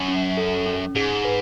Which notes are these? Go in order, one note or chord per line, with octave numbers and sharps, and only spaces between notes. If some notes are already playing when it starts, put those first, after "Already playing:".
Already playing: F#2
C#4
A4
C#4
G#2 G#4
B4